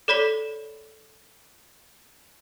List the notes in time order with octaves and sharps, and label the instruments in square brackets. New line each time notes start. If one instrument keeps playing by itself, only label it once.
[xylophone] A4 C#5 D5 B5 B6 G7